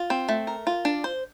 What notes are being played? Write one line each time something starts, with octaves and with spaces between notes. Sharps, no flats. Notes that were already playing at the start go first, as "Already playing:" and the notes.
Already playing: F4
C4
A3
A#4
F4
D4
C5